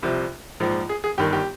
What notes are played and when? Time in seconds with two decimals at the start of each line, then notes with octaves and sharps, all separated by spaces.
0.03 C2 C3 F3
0.60 A#1 G#2 F3
0.89 G#4
1.04 G#4
1.18 G1 G2 D#3 G4
1.33 G4